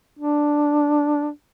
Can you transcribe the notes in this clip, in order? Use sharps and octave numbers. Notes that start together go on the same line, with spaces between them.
D4